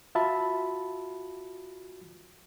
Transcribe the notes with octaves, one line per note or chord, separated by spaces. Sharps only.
F4 F#4 E5 A5 B5